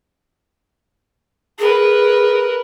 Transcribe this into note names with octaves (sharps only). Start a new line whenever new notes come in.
G#4 A#4 B4